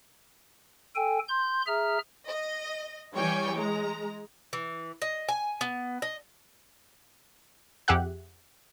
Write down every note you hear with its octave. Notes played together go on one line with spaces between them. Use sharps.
A4 G5 G#5
C6 G6
G#4 E5 A#5 F6
D#5
E3 G3 C#5 G5 G#5 C#6
G#3 A#5
E3
D#5
G#5
B3
D#5
F2 G4 G#4 E5 F#5 F#6